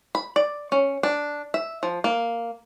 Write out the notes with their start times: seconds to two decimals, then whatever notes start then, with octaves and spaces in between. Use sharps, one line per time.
0.15 B5
0.36 D5
0.72 C#4
1.03 D4
1.54 E5
1.83 F3
2.04 A#3